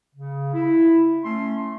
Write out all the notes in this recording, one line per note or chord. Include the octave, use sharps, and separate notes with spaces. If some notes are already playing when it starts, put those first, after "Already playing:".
C#3
E4
A3 C#4 C6